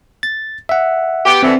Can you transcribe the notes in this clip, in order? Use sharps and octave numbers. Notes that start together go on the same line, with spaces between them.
A6
E5 F#5
B3 G4
B2 D3 E3 C4